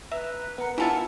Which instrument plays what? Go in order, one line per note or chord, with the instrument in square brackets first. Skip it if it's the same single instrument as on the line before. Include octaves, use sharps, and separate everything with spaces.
[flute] B4 [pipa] E5 [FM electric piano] A#5
[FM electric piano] B3 A#4 [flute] F#5
[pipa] E3 A5 [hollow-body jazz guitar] E4 F4 E5 [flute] F#5